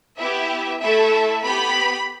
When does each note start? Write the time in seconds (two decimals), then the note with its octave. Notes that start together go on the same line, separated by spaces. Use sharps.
0.17 B3 E4 G4 E5
0.80 A3 E4 A4 E5
1.43 B3 G4 B5